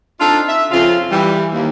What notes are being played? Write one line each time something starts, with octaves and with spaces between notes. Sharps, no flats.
C4 D4 D#4 F4 A4
E5
F2 C#3 F4
E3 G3
D#2